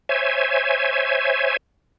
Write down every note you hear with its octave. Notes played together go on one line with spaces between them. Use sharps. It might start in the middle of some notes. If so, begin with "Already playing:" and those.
C5 C#5 E5 G#5